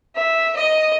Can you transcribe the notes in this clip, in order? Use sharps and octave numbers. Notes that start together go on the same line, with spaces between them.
E5
D#5